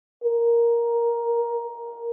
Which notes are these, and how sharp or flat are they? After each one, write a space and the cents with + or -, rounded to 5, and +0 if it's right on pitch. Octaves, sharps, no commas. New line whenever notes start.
A#4 +10